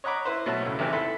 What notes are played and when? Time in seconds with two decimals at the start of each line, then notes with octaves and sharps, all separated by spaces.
0.04 C#5 D#5 F#5 A#5 B5 D6
0.25 E4 B4 C5
0.46 B2 F#3 A3 F#4 A5
0.62 C#2 A2
0.79 G#1 E2 C3 E3 B4 G5
0.93 E4 A4 E5 B5 C6